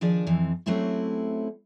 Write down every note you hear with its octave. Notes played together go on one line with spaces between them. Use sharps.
D#3 F3 D4 G#4 D5
F2 E3 C4
F#3 A3 C4 C#4 E4 G4